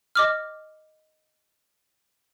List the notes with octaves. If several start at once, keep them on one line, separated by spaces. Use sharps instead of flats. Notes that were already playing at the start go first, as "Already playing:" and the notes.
D#5 D6 F6